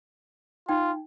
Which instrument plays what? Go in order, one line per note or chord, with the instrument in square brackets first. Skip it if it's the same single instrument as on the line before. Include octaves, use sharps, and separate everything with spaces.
[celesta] D#4 G5 [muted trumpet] F4